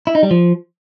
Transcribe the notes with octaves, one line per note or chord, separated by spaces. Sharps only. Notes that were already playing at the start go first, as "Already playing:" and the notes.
E4
D#4
G3
F3